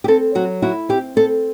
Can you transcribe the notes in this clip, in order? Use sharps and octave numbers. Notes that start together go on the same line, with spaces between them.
G4
C4 A4
F#3 F#4
E4 F#4
C4 G4
C4 A4